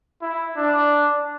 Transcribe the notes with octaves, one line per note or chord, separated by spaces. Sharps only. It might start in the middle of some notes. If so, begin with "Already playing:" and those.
E4
D4